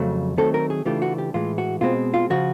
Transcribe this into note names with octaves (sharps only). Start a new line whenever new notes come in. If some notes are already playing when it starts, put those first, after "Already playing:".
Already playing: F2 C#3 F#3 A3
D#3 F#3 A3 C4 A4
A#4
G#4
C#3 E3 A3 D4 F4 G4
F#4
G4
A2 E3 G#3 F4
F#4
B2 G#3 C4 F4
F4
C#3 F3 F#4